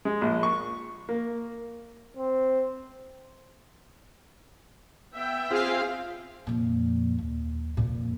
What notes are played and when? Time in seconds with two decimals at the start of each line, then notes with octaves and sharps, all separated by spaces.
0.05 G#3
0.21 A#1
0.43 C#6
1.09 A#3
2.17 C4
5.14 B3 E5 G5
5.51 C4 F4 G#4 F5
6.47 F2 A#2
7.18 D#2
7.77 F2 A#2